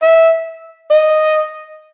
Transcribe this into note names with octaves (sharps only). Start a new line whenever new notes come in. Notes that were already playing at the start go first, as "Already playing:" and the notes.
E5
D#5